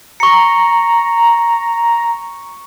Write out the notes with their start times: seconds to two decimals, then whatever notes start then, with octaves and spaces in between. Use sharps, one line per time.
0.20 A#5 C#6 C#7